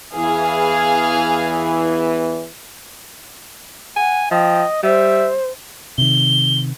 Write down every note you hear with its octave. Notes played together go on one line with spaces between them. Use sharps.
E2 E3 G#4 F5 G#5
F#5 G#5
F3 D#5 G5
G3 C5 E5
C3 D#3 G7